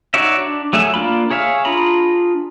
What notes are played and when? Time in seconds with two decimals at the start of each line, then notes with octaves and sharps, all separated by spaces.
0.14 D#4 F#4 C#5 D5 E5
0.39 D4
0.73 F#3 A3 G#4 E5
0.94 A#3 D4 F4 B5
1.31 G#4 C#5 E5 F5
1.65 D4 F4 G#4 A#5 B5